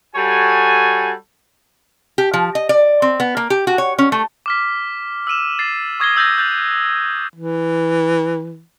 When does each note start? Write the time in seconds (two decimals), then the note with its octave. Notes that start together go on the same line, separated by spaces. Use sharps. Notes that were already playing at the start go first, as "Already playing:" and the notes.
0.15 G3 F#4 A4 C#5 G#5
2.18 G4
2.34 F3
2.55 D#5
2.69 D5
3.02 C4
3.20 B3
3.37 A#3
3.50 G4
3.67 F#4
3.78 C#5
3.99 C#4
4.12 A3
4.46 D6 F6 B6
5.27 E6 F6 D#7 E7
5.59 A6 C7
6.00 C#6 D#6 G#6 A#6 C7 G7
6.17 E6 G6 A6 A#6
6.38 F#6 G6 A6 F7
7.36 E3